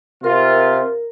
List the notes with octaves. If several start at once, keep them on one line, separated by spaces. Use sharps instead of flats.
C3 F4 A#4